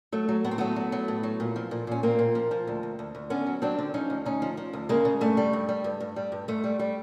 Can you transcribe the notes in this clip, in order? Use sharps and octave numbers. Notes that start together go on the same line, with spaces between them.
F#3 A3
F#3
A2 B3
C4
F#3 A3 B3
F#3
F#3
A2
F#3
A#2
F3
A#2
A#2 C#4
A#2 A#3 C4
A#2
F3
F3
D2
D2
D2
D2
D3 B3 C#4
F#3
F#3 C4 D4
D3
F3 C#4 D#4
D2
D2 C#4 D#4
F3
F3
D2
C#3 G#3 A#3
C#3
G2 A3
G3
G2
G3
G2
G2
G3
G2
G#2 A3
G3
G3